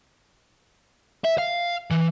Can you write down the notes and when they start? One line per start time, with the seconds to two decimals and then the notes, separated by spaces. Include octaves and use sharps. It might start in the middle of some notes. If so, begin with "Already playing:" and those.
1.25 E5
1.38 F5
1.91 E3